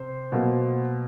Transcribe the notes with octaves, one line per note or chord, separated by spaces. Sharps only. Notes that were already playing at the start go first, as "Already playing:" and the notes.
Already playing: C3 C5
B2 F#3 A#3